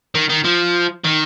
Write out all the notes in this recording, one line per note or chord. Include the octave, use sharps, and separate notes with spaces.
D#3
D#3
F3
D#3